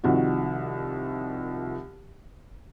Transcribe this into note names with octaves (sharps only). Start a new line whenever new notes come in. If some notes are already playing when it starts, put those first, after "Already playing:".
C2 D#3 F3 F#4